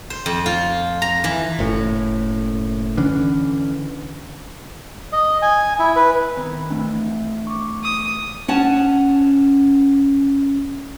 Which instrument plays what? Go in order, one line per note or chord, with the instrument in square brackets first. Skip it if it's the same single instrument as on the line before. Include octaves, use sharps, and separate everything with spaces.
[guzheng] C5
F2
F4
A#5
E3
[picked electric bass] F#1 A2
D3 E3 C#4 D4
[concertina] D#5
G#5
E4
B4
[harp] D#3 B3 C4
[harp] E3 A3 [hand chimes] C4 D4
[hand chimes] C#6 D6
[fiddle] D#6
[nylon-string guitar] C#4 F#5 A5